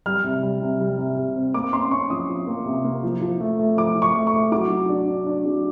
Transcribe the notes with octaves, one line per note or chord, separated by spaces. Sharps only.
G3 F6
C3
G3
C3
G3
C3
C3
C4
A#3 D6
C#4 C6
C#4 C#6
F3 D#6
F3
A#3
C3
A#3
F3
F3
A3
A3
F3 D6
F3
C#6
A3
C#6
A3
F#3 D6
F#3
D4
D4
D4
F#3